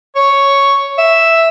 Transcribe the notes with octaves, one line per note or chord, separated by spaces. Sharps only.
C#5
E5